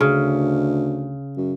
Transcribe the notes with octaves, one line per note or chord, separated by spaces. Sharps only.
D2 C#3
F#2